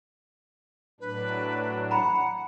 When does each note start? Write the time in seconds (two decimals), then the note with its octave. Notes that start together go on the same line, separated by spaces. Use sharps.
1.00 A2 F#3 D4 B4
1.91 F#5 A#5 B5